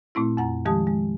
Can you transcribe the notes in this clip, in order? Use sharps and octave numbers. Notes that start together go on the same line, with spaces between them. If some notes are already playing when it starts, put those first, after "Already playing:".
A#2 A3 C4 E4
F2 F#5 A#5
D#3 F3 G#3 G4 A5 D#6
G#3